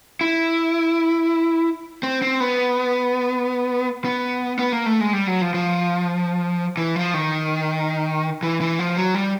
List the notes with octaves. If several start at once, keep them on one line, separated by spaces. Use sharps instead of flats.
E4
C4
C4
B3
B3
B3
A#3
A3
G#3
G3
F#3
F3
F3
E3
F3
D#3
E3
E3
F3
F#3
G3